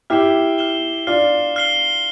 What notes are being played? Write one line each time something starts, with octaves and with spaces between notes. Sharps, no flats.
E4 G4 F6 C7 E7 G7
F6 C7 E7 G7
D4 F4 F6 C7 G7
F6 C7 G7